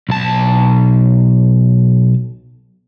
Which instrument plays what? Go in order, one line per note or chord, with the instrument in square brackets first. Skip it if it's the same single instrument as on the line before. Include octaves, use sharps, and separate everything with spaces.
[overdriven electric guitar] B1 A5